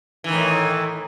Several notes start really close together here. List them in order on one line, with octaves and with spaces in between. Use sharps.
E3 D#3 A2